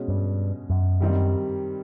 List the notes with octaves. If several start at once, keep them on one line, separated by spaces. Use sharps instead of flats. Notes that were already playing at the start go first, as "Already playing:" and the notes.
Already playing: B2 G#3 C#4
G2
F#2
G2 D#3 G3 C4 D#4